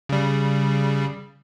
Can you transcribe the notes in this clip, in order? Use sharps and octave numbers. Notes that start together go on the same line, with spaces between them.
C#3 G3